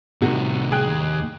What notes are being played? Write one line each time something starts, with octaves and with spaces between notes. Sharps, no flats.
C2 A2 C3 D#3 F#4
G#4 G5 F#6
D#2